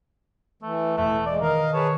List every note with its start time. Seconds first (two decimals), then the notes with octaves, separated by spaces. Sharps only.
0.62 E3 A3
0.97 E1 E2 A2 A3 E5 F#6
1.26 G#3 D5
1.41 D#3 A#4 D#5 F5
1.74 G#4 B4 C#5 A5